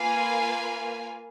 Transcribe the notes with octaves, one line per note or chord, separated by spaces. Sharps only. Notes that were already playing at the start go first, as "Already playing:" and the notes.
Already playing: A#3 F4 B4 F5 G#5